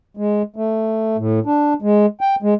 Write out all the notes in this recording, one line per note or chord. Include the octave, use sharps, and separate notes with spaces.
G#3
A3
A2
D4
G#3
G5
G#3